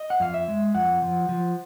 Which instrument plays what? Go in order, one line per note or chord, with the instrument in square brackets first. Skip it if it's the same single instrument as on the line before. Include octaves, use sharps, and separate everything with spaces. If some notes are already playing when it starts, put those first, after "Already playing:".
Already playing: [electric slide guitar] D#5
F#5
F2 F5
E5
G#3
F2 F#5
F3
F3